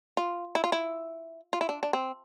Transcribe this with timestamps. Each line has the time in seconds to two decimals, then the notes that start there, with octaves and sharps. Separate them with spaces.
0.17 F4
0.55 E4
0.64 F4
0.72 E4
1.53 F4
1.61 E4
1.69 D4
1.83 D4
1.93 C4